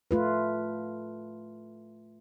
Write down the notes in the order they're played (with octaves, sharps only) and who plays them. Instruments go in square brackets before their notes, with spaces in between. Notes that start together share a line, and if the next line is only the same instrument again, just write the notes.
[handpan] A3 F4 B4